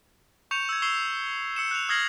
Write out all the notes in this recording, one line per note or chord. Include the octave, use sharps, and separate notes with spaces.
C#6 G6 C#7 E7 F7
E6 G#6
C#6 E6 C7 E7 G7
E6 C#7 E7
F#6 F7
D#6 F6 G#6 A#6 C7 F#7